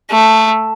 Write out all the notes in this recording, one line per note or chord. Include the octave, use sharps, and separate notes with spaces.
A3